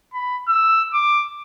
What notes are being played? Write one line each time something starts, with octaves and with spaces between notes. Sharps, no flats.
B5
E6
D6